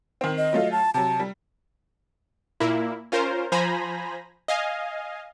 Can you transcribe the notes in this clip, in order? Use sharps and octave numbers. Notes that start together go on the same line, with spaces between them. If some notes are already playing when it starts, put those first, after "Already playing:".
D#3 C4
D#5
F#3 A3 F4
A5
C3 F#3 A5
G3
A#2 A#3 E4
C#4 F4 A#4 C5
F3 C5 G#5 A#5 B5 A#6
D#5 F5 G#5